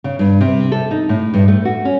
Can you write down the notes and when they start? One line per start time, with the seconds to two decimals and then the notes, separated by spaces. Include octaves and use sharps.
0.04 C#3
0.19 G2
0.41 C3
0.72 A4
0.91 D#4
1.09 A2
1.34 G2
1.48 A3
1.65 F#4
1.85 C#4